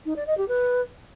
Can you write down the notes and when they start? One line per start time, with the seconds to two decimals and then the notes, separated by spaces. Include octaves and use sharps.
0.06 D#4
0.16 D5
0.27 D#5
0.38 G4
0.48 B4